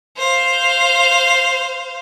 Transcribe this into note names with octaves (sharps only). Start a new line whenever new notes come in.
C5 F5